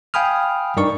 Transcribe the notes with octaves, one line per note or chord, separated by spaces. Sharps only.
F5 G5 G#5 B5 D#6 F6
G2 D#4 A#4 D5 C#6